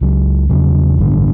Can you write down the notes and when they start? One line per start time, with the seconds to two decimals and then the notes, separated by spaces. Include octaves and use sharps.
0.01 C#2 C#3 F#3
0.49 E2 C#3 F#3
0.97 A1 G2 D3